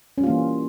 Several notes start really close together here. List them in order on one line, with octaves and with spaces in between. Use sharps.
C#4 G3 F4 A#3 E3